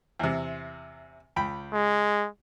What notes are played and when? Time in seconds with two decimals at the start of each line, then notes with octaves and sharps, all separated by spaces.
0.19 E2 C3
1.36 C#2 G5 B5
1.73 G#3